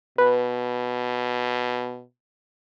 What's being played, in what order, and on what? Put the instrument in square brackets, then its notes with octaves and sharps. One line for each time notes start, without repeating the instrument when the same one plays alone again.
[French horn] B2 [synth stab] B4